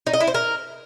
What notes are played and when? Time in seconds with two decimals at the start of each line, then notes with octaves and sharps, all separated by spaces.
0.06 D#4
0.13 D#5
0.20 E4
0.27 C5
0.34 A#4